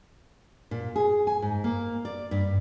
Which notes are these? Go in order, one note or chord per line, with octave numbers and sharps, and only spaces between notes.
A#2
G#4
G#5
G#2
A#3
D5
G2